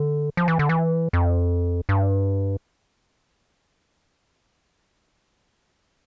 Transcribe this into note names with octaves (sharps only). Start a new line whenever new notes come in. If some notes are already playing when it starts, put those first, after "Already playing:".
Already playing: D3
F3
E3
D3
E3
F2
G2